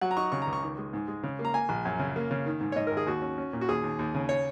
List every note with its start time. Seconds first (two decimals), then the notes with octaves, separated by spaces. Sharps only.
0.01 F#3 F#5
0.11 A#5
0.16 D#4 C#6
0.32 C#3 C#6
0.42 A#5
0.47 C#2
0.53 C#6
0.62 D#3
0.78 G#3
0.93 G#2
1.08 G#3
1.23 C#3
1.39 A#3
1.45 A#5
1.54 A#3 G#5
1.69 A#1
1.85 F#2
1.99 C#3
2.16 A#3
2.31 C#3
2.46 D#3
2.61 G#2
2.72 C#5
2.76 G#2 D#5
2.87 A#4
2.91 G#1
2.97 G#4
3.06 D#2 F#4
3.22 C#4
3.38 C#4
3.53 A#2
3.61 F#4
3.69 D#2 G#4
3.84 D#2
3.99 D#2
4.15 C#3
4.29 C#5